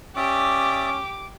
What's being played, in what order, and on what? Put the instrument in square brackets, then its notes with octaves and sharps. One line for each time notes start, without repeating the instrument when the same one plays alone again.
[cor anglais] C#4 [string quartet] G4 [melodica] D5 E5 D#6 [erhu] D6